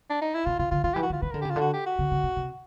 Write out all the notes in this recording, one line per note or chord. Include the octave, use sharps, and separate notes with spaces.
D4
D#4
E4
B2 F4
C3 F4
D3 F4
D#3 F4
E3 G4
F#4
D#3
F4
D#3 B4
A#4
D3
G4
C#3
F4
D3 F#4
G4
F#4
C#3
C#3
C3
C3